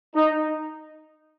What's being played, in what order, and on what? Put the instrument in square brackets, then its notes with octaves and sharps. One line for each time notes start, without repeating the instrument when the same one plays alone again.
[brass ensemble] D#4